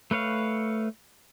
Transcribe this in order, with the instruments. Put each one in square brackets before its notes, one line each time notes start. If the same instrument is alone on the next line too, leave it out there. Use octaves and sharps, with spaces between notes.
[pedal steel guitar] A3 B4 C#5 F5